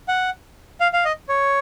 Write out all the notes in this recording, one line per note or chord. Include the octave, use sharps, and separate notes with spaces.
F#5
F5
F5
D#5
C#5